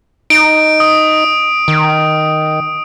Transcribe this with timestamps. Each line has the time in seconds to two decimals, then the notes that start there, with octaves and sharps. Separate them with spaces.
0.30 D#4 D7
0.80 D#6
1.68 D#3